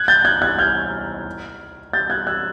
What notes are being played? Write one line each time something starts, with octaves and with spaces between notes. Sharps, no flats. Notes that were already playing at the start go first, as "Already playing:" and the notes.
Already playing: F#6 G#6
G6 A6
F#6 G#6
F#6 G#6
F6 G6
G6 A6
F#6 G#6
E6 F#6